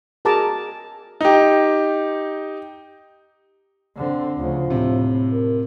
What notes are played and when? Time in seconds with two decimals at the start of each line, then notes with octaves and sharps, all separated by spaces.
0.25 F#4 G#4 A#4 A5 A#5 D6
1.21 D#4 G4
3.97 D3 C4
4.38 D2 C#3 F3
4.70 A2 C3
5.33 A#4